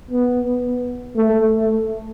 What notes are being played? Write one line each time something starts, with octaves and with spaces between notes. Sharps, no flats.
B3
A3